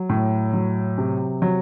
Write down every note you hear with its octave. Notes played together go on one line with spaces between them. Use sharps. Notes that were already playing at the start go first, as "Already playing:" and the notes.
Already playing: F#3
A2
F#3
C3
F#3